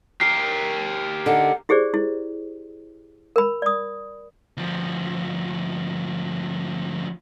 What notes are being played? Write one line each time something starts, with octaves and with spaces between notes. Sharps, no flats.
G4 A#4 C7
D3 D#4 F#5
E4 G4 G#4 C5 D5
E4
A#4 B5
D5 D#6
D2 F3